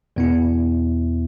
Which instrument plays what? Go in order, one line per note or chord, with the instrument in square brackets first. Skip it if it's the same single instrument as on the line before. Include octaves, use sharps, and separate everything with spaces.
[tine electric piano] E2 B2 B3 E4